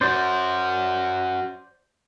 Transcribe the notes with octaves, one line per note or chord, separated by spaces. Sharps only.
C#4 F#4 C5 D5